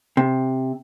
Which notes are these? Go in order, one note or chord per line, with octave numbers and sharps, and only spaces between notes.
C3